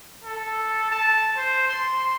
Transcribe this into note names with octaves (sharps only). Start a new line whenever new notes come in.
A4
A5
C5
C6